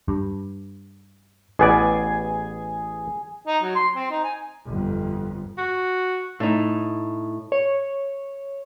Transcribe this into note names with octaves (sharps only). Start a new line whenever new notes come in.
G2
A1 B3 G#4 D5 G#5
D#4
F#3
C6
C4
D#4
G#5
G1 F2
F#4
A2 D#4
C#5